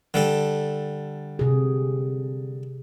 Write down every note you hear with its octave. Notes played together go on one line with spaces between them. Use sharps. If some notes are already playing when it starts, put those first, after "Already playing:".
D3 G3 A4
C3 G#4